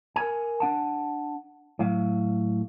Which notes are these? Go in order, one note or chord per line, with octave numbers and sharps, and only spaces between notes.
A#4 G#5
D4 F#5 A5
A2 F#3 F5